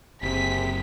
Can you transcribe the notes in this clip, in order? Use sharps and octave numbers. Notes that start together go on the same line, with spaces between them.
F#1 C3 C4 G#4 B6